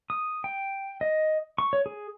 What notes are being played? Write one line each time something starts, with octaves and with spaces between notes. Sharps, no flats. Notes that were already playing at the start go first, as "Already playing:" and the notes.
D#6
G5
D#5
C#6
C#5
G#4